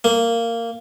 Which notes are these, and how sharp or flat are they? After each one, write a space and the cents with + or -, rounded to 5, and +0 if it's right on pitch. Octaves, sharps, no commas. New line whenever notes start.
A#3 -15